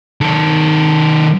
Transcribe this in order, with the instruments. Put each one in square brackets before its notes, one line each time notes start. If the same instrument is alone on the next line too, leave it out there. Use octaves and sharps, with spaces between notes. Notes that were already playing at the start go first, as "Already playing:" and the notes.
[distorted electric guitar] D#3 A4